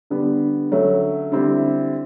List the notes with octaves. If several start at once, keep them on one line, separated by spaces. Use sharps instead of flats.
D3 G3 B3 D4
D3 F#3 A3 C#4
D3 G3 C4 E4